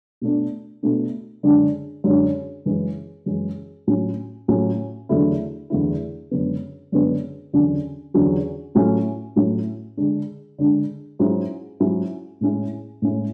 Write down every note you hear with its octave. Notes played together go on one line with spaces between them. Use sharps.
B2 A3 D4
B2 A3 D4
F#2 D3 G#3 D4
F#2 D3 G#3 D4
F#2 E3 G#3
F#2 E3 G#3
A2 F#3 C#4
A2 F#3 C#4
E2 D3 F#3 A3 E4
E2 D3 F#3 A3 E4
F#2 D3 G#3 B3
F#2 D3 G#3 B3
E2 D3 F#3 C#4
E2 D3 F#3 C#4
A2 F#3 A3 C#4 E4
A2 F#3 A3 C#4 E4
D3 G#3 D4
D3 G#3 D4
G#2 F#3 C#4 E4
G#2 F#3 C#4 E4
A2 G#3 C#4 E4
A2 G#3 C#4 E4